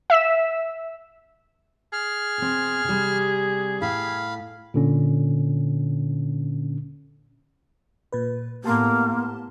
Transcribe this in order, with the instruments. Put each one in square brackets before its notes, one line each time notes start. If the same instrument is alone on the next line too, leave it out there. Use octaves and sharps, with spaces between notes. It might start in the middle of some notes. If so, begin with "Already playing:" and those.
[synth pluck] E5 E6 B6 E7
[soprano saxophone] G#4 [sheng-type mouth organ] F6
[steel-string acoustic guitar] B2 C4
C3 G3
[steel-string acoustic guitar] A2 [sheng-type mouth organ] F5 B5
[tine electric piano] A#2 D3 C#4
[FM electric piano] A#2 B4
[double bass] A2 B3 [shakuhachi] A#3 [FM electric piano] G4 A5 C6